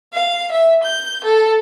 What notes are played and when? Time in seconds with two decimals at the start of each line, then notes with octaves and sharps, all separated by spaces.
0.13 F5
0.51 E5
0.82 G6
1.23 A4